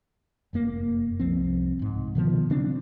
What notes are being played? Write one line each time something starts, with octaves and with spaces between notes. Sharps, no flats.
F1 F#2 A#3
C2 F3 C4
C2 G#2
B2 D#3 F3 B3
C#3 F#3 C4 D4